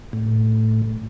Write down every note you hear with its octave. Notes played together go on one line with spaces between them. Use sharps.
A2